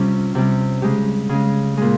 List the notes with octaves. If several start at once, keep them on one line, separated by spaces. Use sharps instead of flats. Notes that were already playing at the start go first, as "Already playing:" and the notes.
Already playing: C3 G3 C#4 F4
C3 G3
C#3 G#3 G4
C#3 G#3
A#2 G#3 G#4